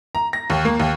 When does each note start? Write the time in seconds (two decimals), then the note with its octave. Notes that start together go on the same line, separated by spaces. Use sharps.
0.15 A#5
0.33 A#6
0.50 D#2
0.65 A#3
0.80 D#2